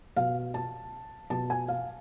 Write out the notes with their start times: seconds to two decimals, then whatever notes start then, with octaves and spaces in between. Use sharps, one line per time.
0.17 B2 F5
0.54 A5
1.30 B2 A5
1.50 G#5
1.68 F5